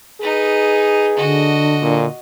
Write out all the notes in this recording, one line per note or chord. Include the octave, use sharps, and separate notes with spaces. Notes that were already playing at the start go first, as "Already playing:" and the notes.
D#4 G#4 B4
D3 F#4 D#5
A#2